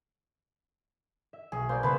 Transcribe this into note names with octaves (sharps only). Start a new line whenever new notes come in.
E5
B1 G#4
A#3 C5 D5
C#3 B3 C#4 B4 A5 C6